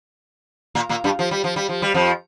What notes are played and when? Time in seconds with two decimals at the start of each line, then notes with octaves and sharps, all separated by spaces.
0.75 A#2 A#3
0.89 A#2 A#3
1.04 G2 G3
1.19 F3
1.31 G3
1.44 F3
1.56 G3
1.69 F3
1.82 G3
1.94 F2 F3